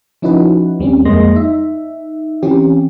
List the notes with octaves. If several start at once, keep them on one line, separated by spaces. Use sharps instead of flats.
F3 C#4 D#4 E4 F#4 B4
D#2 G3 C4 C#4
F2 G#3 A#3 D#5 C6 A#6
D#4 E5
E3 C4 C#4 G4